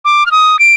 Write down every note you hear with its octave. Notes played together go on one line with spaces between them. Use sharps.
D6
F6
D#6
D7